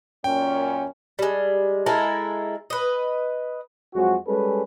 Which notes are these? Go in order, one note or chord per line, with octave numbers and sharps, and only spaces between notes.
F#2 A#2 C#4 G5
G3 G#3
G#3 E4 A4 A#4
B4 D#5
F2 F#3 G#3 F#4
G3 G#3 C#4 A4 B4